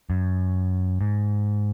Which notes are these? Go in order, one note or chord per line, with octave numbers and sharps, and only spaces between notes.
F#2
G#2